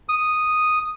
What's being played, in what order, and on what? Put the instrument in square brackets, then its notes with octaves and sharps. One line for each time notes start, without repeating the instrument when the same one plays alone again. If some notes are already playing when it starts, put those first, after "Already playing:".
[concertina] D#6